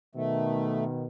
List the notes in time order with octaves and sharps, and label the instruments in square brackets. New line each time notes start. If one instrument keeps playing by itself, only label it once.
[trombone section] B2 D#3 [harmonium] A3